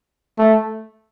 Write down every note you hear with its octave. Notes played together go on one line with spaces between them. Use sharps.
A3